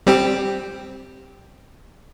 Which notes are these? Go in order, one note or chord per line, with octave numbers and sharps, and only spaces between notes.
G3 C4 G4